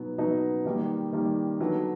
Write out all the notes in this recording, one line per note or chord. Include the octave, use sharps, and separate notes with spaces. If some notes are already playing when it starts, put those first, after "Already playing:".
Already playing: B2 F#3 B3 D#4
B2 F#3 B3 D#4
D#3 G3 A#3 D#4
D#3 G3 A#3 D#4
D3 F#3 B3 D#4